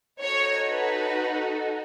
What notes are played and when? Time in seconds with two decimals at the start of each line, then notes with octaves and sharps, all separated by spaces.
0.21 D#4 F#4 A4 C#5
0.69 B4